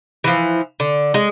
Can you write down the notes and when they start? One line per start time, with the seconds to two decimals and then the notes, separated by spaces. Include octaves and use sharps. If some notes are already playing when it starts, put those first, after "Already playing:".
0.24 E3 F3
0.80 D3
1.14 G#3